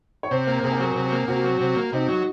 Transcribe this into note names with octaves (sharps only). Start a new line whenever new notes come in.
C#5
C3 C5
A#3 A#4
C3 G#4
A#4
F#3 G#4
C3
A#3
C3 F#4
F#3
C3
A#3
C3 D#4
F#3 F#4